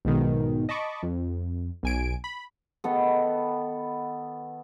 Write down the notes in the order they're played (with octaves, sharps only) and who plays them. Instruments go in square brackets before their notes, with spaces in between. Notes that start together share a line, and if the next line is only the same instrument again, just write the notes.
[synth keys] B1 G#2 B2 D#3
D#5 A5 B5 C#6 D6
F2
B1 G#5 D7
B5
[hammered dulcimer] D#3 B3 A4